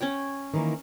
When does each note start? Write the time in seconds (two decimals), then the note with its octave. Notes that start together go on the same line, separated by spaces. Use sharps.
0.01 C#4 C#5 G5
0.54 D#3 E3 A#3